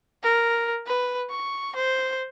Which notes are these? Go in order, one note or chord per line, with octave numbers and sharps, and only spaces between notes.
A#4
B4
C#6
C5